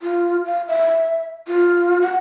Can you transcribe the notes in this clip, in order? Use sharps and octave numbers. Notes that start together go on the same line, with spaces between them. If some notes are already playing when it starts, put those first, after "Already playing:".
F4
F5
E5
F4
F#5